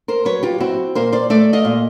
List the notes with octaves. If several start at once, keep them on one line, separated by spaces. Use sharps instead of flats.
A#4 C5
F#3 B4 C#5
F4 G4
C4 E4 F#4
A#2 A#4 C5
C5 D5
A3 D5 E5
D#5 F5
A#2